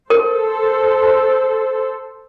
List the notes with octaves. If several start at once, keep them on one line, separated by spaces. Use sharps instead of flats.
A4 A#4 C5